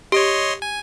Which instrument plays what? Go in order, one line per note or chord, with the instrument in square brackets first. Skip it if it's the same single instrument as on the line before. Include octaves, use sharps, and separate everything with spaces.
[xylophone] G4 [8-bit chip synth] C#5 D#5 C6
[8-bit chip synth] G#5